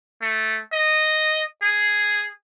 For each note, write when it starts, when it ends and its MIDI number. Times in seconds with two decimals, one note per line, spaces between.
0.22 0.59 57
0.73 1.42 75
1.62 2.29 68